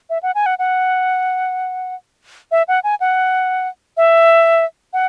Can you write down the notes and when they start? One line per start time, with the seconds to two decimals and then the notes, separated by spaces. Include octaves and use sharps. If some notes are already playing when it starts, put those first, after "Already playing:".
0.10 E5
0.23 F#5
0.35 G#5
0.46 F#5
0.59 F#5
2.51 E5
2.68 F#5
2.84 G#5
3.00 F#5
3.97 E5
4.93 F#5